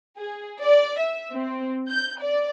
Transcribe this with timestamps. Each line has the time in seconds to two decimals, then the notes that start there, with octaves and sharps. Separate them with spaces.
0.17 G#4
0.60 D5
0.99 E5
1.33 C4
1.87 G6
2.20 D5